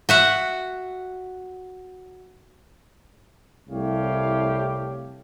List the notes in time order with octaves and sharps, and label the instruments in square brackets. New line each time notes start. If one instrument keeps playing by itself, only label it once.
[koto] F#4 E5 F#5
[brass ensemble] C2 A3 E4 G4 C#5 F5